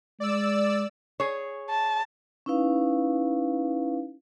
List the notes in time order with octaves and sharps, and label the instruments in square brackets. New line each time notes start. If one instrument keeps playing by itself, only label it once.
[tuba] G#3 [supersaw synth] D5 E6
[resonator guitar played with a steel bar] G#4 C#5
[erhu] A5
[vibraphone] C#4 D#4 E4 B4 F5